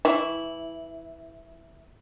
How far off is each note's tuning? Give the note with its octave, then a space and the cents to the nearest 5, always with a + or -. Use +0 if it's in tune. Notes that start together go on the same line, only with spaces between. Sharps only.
E3 +5 E4 -10 C#6 +0